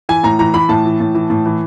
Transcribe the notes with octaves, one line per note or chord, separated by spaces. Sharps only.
E3 G#5
A2 A#5
E3 A#5
E3 B5
A2 A5
E3
A2
E3
A2
E3